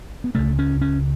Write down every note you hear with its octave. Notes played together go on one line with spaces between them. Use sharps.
B3
C#2 C#3 A3
C#4
C#4